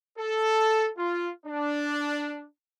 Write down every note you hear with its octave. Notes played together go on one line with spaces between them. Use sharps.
A4
F4
D4